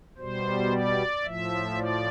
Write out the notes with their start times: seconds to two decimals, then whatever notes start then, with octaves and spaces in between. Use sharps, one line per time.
0.18 B2 G3 C5
0.71 D5
1.24 A2 F3 E5
1.76 D5